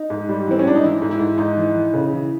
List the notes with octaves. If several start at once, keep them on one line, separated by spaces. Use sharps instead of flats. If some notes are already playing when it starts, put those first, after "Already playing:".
Already playing: D#4
G#2
G3
E3 C4
C#4
G#2 D4
D#4
E3 E4
G#2
E4
G#2
G#2 D#4
E3
E3
C#3
E3